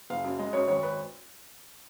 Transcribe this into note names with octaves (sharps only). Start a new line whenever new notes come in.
F#1 F5
F#2
G#3 D#5
F#2 C#5
G#1 C#5
B4